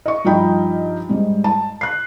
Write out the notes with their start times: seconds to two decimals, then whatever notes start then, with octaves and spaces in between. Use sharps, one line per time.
0.06 D#5 C#6
0.25 G2 F3 D#4 D#5 G5 B5
1.09 G#2 G3
1.44 A5
1.81 F#6 C7